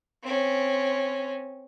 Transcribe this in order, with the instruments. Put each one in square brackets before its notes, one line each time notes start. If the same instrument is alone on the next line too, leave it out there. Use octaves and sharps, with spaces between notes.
[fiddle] C4 C#4